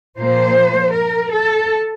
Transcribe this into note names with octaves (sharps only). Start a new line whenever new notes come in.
A#2 F3 A#3 C5
A#4
A4